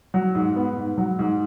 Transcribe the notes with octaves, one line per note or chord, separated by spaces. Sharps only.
F#3
G#2
B3
G#2
F#3
G#2